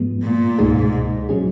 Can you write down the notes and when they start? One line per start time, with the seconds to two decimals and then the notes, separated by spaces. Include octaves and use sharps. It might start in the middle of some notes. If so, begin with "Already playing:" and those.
Already playing: G#2 F3 G#3 B3
0.23 A#2
0.58 C#2 G#2 B2 G#3 D#4 G#4
1.29 A#2 F#3 C#4 G#4